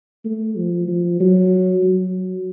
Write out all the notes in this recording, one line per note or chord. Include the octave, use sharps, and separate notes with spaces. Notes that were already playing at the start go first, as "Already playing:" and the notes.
A3
F3
F3
F#3
F#3